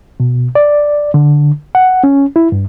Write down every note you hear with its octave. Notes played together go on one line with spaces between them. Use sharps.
B2
D5
D3
F#5
C#4
E4
G2